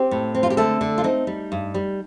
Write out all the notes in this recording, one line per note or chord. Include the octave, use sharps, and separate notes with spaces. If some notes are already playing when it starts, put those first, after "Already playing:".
Already playing: C4 G4
A2
C4
F4
G4
D3 A3 A4
D3
F4
C4 D#4
G3
G2
G3